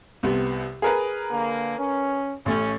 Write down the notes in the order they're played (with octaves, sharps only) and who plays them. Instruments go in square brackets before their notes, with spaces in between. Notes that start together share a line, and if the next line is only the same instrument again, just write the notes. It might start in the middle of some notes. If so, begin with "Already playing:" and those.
[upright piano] C2 C3 B3
G#4 A#4 B4
[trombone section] D3 A#3
C#4
[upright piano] A1 A3 [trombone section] C#4